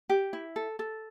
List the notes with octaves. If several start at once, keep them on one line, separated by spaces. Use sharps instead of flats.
G4
E4
A4
A4